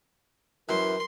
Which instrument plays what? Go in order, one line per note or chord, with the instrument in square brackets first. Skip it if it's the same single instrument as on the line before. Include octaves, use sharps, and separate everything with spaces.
[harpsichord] F#2 [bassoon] E3 [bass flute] A#4 [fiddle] C6